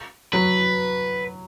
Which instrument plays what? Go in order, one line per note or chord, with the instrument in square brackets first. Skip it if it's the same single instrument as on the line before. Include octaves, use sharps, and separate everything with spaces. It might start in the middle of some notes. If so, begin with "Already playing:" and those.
[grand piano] F#3 [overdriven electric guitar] B4